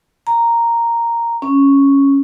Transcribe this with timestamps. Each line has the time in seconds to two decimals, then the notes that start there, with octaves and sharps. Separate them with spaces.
0.27 A#5
1.42 C#4